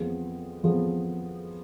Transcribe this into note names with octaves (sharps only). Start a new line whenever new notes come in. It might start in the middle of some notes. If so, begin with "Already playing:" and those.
Already playing: F2 F3 G#3 B3
F2 F3 G#3 B3